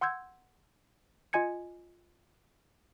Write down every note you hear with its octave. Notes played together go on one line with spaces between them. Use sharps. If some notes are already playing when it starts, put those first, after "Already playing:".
F#5 C6 E6 G6 G#6
F4 D#5 G#5 G#6 C#7